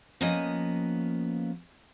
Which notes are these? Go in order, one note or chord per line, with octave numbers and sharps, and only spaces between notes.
F3 A#3 B3 C#4 D#5